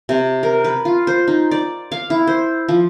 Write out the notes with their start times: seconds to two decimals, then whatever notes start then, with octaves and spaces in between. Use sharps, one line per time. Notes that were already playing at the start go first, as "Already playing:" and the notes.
0.09 C3
0.43 A#4
0.64 B4
0.85 F4
1.07 C5
1.28 D#4
1.51 D5
1.92 F5
2.10 E4
2.27 C5
2.68 F3